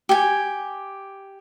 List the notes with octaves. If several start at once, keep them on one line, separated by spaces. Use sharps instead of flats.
G4 G#5